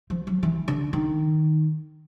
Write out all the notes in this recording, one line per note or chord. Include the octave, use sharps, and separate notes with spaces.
F3
F#3
E3
D3
D#3